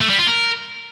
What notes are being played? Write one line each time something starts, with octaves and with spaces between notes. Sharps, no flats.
A3
G3
F4
A#4